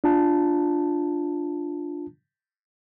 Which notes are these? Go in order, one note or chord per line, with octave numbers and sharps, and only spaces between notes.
D4 F4 A5